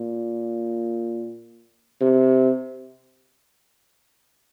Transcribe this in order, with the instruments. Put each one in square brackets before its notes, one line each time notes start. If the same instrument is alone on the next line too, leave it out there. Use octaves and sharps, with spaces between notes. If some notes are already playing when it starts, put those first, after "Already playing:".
Already playing: [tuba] A#2
C3